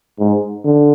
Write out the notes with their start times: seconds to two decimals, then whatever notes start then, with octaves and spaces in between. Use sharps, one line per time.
0.19 G#2
0.65 D3